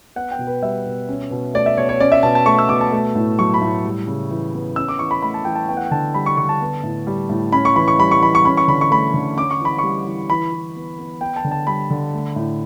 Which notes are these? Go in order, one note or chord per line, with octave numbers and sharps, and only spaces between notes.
B3 F#5
G5
B2
B4
G3 E5
B2
C#4
B2
A3 D5
E5
B2 C#5
C#5
C#4 D5
E5
B2 A5
A5
A3 C#6
E6
B2 D6
A5
A3
A2
F#3 C#6
B5
A2
G3
C#3
E3
B3
C#4 E6
D6
E3 C#6
B5
A3 B5
A5
E3 G5
A5
B3 G5
F#5
G5
D3 A5
G3 B5
C#6
D3 C#6
A5
B3
A2
G3
A2
C#4 B5
C#6
E3 B5
C#6
G3 B5
C#6
E3 B5
C#6
C#4 B5
C#6
D3 B5
C#6
A3 B5
D3
C#4 D6
C#6
E3 B5
G3 C#6
E3
E3 B5
E3
B3
B3
B3 G5
A5
D3
A5
G3 B5
D3
A3
A2